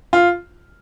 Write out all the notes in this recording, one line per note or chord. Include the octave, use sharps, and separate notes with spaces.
F4